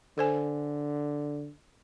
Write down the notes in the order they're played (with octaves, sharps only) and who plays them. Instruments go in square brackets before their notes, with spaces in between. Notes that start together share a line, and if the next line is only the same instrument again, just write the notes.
[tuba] D3 [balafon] A4 C5 G#5